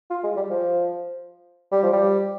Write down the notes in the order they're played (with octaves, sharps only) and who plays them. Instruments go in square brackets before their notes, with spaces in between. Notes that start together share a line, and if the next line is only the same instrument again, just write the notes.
[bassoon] F4
G#3
G3
F3
G3
F3
G3